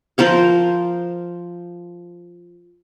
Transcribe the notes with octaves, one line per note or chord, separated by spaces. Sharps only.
F3 A#4 C5 F5